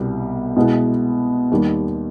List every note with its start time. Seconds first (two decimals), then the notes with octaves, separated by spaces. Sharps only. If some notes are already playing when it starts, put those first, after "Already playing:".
Already playing: C2 B2 G3
0.57 B2 G#3 B3 E4
1.51 D#2 D#3 G3